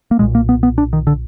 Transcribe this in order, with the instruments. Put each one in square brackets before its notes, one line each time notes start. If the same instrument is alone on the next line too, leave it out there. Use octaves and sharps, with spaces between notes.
[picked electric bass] A#3
B1 A#2 G#3
A#3
B3
B3
D4
D#3
D3